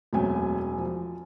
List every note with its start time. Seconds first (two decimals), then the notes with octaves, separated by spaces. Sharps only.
0.13 E1 F#2 A3 C4 G#5
0.78 F3